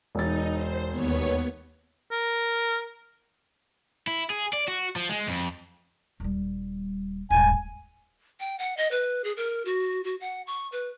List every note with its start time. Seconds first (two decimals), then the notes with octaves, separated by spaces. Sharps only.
0.15 E1 D#4 A6
0.53 C5
0.90 D#2 B3 C#5
2.12 A#4
4.07 E4
4.30 G#4
4.53 D5
4.68 F#4
4.96 F3
5.09 G#3
5.28 F2
6.20 D#1 G3
7.30 D#1 G#2 G#5
8.40 G5
8.59 F#5
8.77 D#5
8.91 B4
9.24 G#4
9.37 A#4
9.65 F#4
10.04 F#4
10.21 F#5
10.47 C#6
10.72 B4